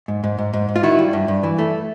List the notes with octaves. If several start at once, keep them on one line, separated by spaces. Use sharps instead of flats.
G#2
G#2
G#2
G#2
G#2
F4
D#3 E4 F#4
G3
G2
G2
E3
A3